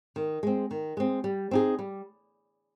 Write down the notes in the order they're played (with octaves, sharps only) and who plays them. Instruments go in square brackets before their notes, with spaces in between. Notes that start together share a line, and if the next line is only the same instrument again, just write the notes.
[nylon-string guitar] D#3
G#3 C4
D#3
G#3 C4
G3
C4 D#4 G#4
G3